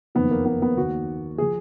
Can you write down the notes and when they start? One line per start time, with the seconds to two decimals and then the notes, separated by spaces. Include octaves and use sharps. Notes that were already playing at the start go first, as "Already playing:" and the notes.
0.15 F#1 F2 D#3 B3
0.31 A#3
0.46 B3
0.62 B3
0.76 D#2 D#3 F#4
1.38 F3 G#4